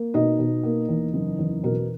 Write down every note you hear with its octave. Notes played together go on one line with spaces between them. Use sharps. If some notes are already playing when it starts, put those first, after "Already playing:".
Already playing: A#3
B2 D#4 D#5
B2
A#3
E2
F#1
E2
B2 A#4